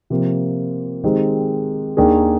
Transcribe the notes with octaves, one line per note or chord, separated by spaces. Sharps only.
C3 F3 A#3 F4
D#3 G#3 C4 D#4 G4
D#2 D#3 A#3 D4 G#4